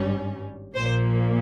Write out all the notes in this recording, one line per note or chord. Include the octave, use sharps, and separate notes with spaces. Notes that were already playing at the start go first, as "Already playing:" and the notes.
Already playing: G#1 G2 G3 C#4
A#1 A#2 F3 A#3 C5